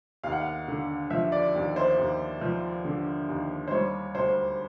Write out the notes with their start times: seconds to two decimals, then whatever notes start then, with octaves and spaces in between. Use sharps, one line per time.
0.23 D#2 F5
0.32 F#5
0.41 F5
0.68 D3
1.10 F3 E5
1.32 D5
1.55 D#2
1.76 C5
1.98 D#2
2.41 F3
2.85 D3
3.29 D#2
3.68 C5
3.71 G3 C#5
4.15 D2 C5